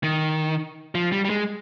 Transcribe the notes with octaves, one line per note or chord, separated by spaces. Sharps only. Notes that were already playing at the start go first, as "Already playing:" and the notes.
D#3
F3
G3
G3
G#3